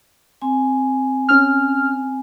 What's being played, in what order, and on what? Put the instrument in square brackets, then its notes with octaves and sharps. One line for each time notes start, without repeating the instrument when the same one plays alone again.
[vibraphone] C4 G#5
[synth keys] C#4 F6